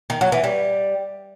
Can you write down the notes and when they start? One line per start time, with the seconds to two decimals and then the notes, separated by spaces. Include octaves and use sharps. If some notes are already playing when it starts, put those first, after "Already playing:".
0.10 D#3
0.21 F#3
0.32 E3
0.44 G3